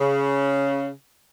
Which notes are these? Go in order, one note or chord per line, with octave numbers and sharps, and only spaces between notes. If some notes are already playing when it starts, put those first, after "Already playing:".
C#3